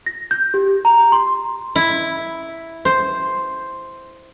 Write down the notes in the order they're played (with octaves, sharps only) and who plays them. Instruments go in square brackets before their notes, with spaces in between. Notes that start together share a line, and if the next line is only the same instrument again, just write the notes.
[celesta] A#6
G6
G4
A#5
C6
[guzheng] E4
C5